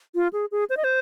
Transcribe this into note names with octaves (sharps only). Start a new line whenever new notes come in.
F4
G#4
G#4
C5
D#5
C5